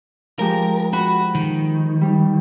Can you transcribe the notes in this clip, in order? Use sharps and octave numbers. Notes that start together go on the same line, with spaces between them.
F3 G#3 G4 A#4
F#4 B5
D#3
G3